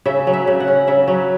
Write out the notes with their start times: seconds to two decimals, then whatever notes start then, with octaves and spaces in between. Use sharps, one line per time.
0.06 C#3 E5
0.27 F#3
0.33 E5
0.47 C#3
0.60 F#5
0.68 C#4
0.87 C#3 E5
1.08 F#3